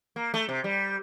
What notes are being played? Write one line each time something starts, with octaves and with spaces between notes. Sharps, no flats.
A#3
A3
C3
G3